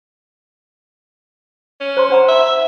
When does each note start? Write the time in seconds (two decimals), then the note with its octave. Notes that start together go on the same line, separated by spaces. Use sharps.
1.80 C#4
1.97 C5 A#5 C6
2.10 D4 F#5 A#5
2.28 E5